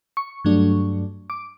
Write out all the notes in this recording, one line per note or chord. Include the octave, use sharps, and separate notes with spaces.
C#6
G2 F#3 A3 D4
D6